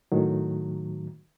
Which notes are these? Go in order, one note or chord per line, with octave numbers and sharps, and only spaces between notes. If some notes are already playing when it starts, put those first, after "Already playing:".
A2 D#3 F#3